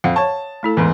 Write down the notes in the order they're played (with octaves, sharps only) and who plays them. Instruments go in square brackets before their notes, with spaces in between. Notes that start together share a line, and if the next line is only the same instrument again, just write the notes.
[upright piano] F2 [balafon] F5 F#5
[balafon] C#5 C#6 [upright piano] A5
[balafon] A3 E4 A4
[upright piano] E2 G#2 [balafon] E3